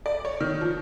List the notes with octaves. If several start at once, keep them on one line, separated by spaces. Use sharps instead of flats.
D5
C#5
D#3
F3